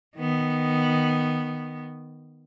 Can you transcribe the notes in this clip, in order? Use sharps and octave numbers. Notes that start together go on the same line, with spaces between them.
D#3 B3